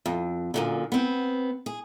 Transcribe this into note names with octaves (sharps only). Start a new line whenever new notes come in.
F2
F#2 A#2 D3
B3 C4
G#4